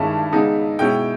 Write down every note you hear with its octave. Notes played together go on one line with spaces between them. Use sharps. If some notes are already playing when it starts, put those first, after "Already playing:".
Already playing: G2 D#3 G#3 C#4 E4 E5
C#3 G#3 B3 D#4
B2 G#3 C#4 E4 G5